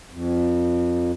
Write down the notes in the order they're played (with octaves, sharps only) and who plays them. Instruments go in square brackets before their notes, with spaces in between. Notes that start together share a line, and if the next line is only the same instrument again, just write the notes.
[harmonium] F2